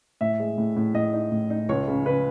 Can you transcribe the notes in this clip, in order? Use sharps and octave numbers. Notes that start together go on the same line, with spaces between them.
A2 E5
G#3
A2
A2
A2 D#5
D#4
A2
D#4
C#2 C#5
C#3
C#3 B4